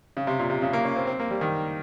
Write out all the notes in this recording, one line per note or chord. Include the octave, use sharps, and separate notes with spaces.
C#3
C3
A#2
C3
C#3
A#3
C#4
C4
C4
A#3
G3
D#3